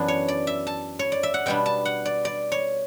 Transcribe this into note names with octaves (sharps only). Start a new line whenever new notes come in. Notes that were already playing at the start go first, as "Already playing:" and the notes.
Already playing: F#2 E3 B3 D4
C#5
D5
E5
A5
C#5
D5
E5
F#5
B2 G3 B3 D4 G5
A5
F#5
D5
D5
C#5